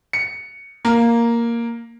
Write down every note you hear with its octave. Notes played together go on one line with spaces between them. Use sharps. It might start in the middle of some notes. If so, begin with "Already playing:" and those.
C#7
A#3